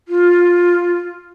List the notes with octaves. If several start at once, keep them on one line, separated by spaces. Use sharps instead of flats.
F4